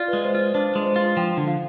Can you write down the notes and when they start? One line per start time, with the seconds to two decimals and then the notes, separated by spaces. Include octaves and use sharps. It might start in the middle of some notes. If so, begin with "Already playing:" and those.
Already playing: F4 D5
0.08 G#3 B4
0.24 C5
0.35 F4 C5
0.54 D4 C5
0.75 G#3
0.86 C5
0.96 F4
1.17 F3 G5
1.37 D3
1.48 F5